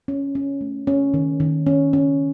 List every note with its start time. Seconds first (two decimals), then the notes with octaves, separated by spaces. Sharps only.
0.08 C#4
0.35 C#4
0.61 A3
0.87 C#4
1.14 D#3
1.40 D#3
1.66 C#4
1.93 C#4